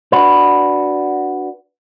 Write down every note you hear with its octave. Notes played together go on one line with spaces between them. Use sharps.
D4 F#4 B4